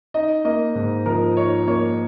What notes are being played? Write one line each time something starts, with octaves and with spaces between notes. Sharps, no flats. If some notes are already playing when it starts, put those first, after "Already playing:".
D#4 D#5
A#3 D#5
G#2
F3 A#4
D#4 C#5
A#3 C#5